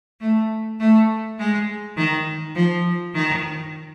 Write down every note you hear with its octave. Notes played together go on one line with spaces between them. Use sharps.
A3
A3
G#3
D#3
F3
D#3